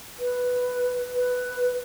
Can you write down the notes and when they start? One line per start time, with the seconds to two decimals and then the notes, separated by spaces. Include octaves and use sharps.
0.20 B4
1.15 B4